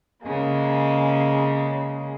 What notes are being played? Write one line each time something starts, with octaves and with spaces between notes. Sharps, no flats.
C#3 G#3 A#3